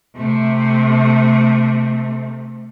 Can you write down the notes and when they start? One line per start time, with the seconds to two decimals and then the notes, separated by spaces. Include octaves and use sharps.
0.16 C3 A3